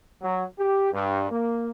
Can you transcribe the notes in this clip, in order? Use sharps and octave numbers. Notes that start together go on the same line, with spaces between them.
F#3
G4
G2
A#3